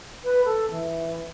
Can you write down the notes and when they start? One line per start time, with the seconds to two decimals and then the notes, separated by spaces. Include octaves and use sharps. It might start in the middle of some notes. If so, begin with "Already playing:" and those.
0.24 B4
0.45 A4
0.71 E3